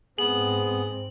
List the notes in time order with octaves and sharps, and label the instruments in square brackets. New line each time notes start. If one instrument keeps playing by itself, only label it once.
[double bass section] G#2 C4 [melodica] B3 [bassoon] G#4 [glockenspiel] F#7